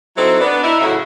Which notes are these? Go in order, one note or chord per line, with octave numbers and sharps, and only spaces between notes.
F#3 C4 D#4 E4 A4
B3 D4
D#4 E4
F#2 A2 C#3 E4 F#4